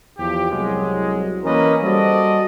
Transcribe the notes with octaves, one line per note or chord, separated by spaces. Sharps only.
E2 F3 G4
C2 F#3 G#3
E3 A#3 C#4 A#4 B4 D#5
G3 F#4 A4 C5 D5 D#5